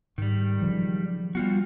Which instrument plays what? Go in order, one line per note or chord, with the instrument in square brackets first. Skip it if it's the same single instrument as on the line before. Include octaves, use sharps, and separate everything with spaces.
[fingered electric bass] G#2 [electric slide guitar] D#3 G3
[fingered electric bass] C#3 F3 F#3
[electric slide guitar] G3 F4 F#4 [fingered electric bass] B3